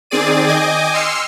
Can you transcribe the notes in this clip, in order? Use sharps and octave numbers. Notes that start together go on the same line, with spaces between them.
D#3 C4 G#4 D5 D#7
D#5 G5 G#5 D6 D#6
C6 E6 F6 C7 C#7